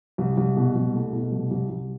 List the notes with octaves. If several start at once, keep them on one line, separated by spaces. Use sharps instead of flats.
C2
C2
B2
C2
A3
B2
C2
C2
C2